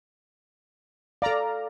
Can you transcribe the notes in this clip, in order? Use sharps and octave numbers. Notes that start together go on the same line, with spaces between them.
A4 D5 F5 A#5